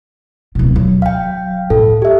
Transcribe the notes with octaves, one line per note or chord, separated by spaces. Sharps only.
D1 B2
F#3
F5 G5
A2 A4
G4 E5